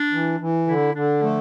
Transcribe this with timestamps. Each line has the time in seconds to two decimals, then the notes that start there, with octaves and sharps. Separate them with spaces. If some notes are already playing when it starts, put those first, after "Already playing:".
Already playing: D4
0.12 E3
0.40 E3
0.67 D3 E4
0.94 D3 D4
1.22 F3 A3